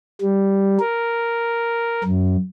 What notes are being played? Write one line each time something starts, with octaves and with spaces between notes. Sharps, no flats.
G3
A#4
F#2